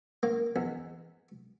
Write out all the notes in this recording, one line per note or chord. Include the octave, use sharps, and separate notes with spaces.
A#3
E2